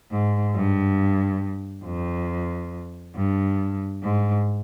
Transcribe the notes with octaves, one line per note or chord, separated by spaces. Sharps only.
G#2
G2
F2
G2
G#2